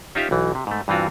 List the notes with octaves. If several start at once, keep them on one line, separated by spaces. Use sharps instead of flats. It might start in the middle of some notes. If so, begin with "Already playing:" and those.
C#4 D#4 F4 G4 E5 F5
B1 E3
C3
G#2 A3
G2 E3 C4 F4 F#4